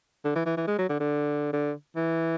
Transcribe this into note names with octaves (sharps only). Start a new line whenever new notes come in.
D3
E3
E3
E3
G#3
F#3
D3
D3
D3
E3